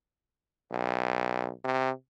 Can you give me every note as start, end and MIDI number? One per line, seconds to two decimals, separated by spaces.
0.72 1.50 35
1.65 1.91 48